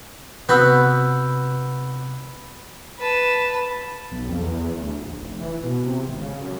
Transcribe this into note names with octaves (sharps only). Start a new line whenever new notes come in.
C3 B3 F#4 B5 E6 F#6 G6
B4 A5
B1
F2
E2
D2
A#1
F1
E3
B2
C3
G#1
C#3
F#2